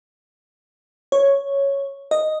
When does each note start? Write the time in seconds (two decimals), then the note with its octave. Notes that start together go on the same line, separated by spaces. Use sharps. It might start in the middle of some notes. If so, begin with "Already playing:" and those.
1.12 C#5
2.11 D#5